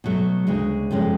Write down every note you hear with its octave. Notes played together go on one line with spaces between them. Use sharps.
B2 F#3 A3
D2 C#3 G#3
F2 F3 G#3 C#4